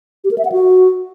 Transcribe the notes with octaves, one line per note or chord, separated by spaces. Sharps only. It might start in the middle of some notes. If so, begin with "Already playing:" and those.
G4
A#4
E5
F#5
F#4